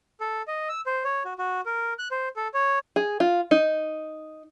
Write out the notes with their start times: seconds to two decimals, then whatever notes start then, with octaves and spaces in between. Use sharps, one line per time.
0.20 A4
0.48 D#5
0.69 E6
0.86 C5
1.04 C#5
1.25 F#4
1.38 F#4
1.66 A#4
1.99 F#6
2.11 C5
2.36 A4
2.54 C#5
2.96 G#4
3.20 F4
3.51 D#4